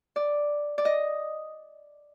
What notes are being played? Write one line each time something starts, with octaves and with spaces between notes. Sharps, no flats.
D5
D5
D#5